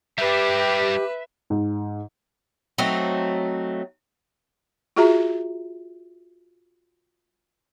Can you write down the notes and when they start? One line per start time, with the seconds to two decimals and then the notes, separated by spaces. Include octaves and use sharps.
0.18 G3 D4 G4 B4 E5
1.50 G#2
2.78 F#3 A3 C4 D#4
4.96 F4 F#4 G#4 E5 A#5